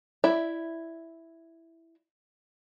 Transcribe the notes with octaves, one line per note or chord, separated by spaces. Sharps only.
E4 D5 E5